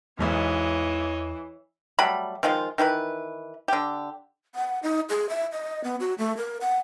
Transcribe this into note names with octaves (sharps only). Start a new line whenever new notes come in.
B1 E2 G#2 B2 E3 C#5 D#5
F#3 G3 A3 B5
D#3 F3 G#3 F4
D#3 E3 G4 B4
D3 G4
F#5
D#4
G#4
E5
D#5
B3
F#4
A3
A#4
F#5